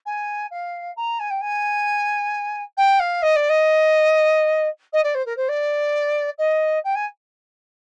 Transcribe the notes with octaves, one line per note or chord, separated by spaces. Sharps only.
G#5
F5
A#5
G#5
G5
G#5
G5
F5
D#5
D5
D#5
D#5
D5
C5
A#4
C5
D5
D#5
G5
G#5